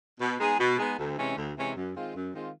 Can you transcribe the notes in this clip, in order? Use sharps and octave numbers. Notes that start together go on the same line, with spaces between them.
B2
G#3 B3 D#4 G#4
B2
G#3 B3 D#4 G#4
D2
C3 E3 G#3 C#4
D2
C3 E3 G#3 C#4
F#2
D#3 G#3 C4 F4
F#2
D#3 G#3 C4 F4